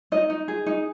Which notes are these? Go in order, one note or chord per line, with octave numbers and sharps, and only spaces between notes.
D#4 D#5
D#4
G#4
D#4